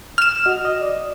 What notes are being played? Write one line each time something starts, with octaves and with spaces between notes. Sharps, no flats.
F6 E7
F#4 D#5
D#5
D5